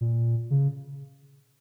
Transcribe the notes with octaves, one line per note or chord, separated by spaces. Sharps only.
A#2
C#3